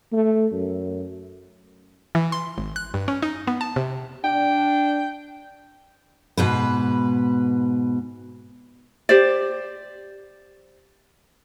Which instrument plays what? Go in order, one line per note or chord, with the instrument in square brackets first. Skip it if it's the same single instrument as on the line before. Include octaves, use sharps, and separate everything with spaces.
[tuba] A3
F#2
[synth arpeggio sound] E3
C6
G#1
F#6
G2
C#4
D#4
B3
A5
C3
[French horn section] D4 [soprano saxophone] G5
[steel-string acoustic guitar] G#2 B2 B4
[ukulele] G4 C5 D5